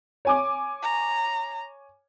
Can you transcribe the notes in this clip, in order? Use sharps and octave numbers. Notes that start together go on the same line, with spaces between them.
C#5 G#5 D6
A#5